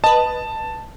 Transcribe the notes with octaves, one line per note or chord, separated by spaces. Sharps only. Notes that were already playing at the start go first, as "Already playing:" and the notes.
B4 D#5 A5